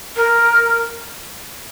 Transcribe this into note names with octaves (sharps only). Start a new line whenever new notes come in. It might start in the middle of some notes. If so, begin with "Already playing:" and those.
A#4